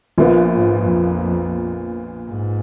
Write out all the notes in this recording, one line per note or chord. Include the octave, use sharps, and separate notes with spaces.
A#1 A#2 F3 B3
G#2
F2
G#2